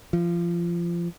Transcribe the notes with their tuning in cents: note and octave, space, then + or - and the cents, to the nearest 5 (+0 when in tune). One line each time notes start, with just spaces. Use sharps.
F3 -25